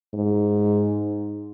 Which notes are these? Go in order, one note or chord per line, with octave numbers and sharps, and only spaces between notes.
G#2